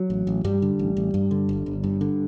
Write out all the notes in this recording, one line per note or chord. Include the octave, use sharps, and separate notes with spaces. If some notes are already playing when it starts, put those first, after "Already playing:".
Already playing: F#3
A1
A1
G2 G3
D3
A1
A1
G2
D3
G1
G1
G2
D3